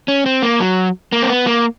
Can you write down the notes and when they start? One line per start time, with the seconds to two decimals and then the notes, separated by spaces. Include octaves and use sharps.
0.08 C#4
0.26 C4
0.42 A#3
0.60 F#3
1.12 A#3
1.23 C4
1.29 B3
1.47 A#3